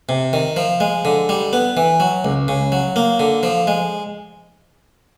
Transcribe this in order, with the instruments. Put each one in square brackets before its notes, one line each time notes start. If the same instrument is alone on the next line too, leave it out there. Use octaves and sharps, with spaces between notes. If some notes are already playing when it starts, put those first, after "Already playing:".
[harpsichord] C3
D#3
F3
G#3
D3
G3
B3
E3
F#3
C#2
C#3
F#3
A#3
D3
F3
G#3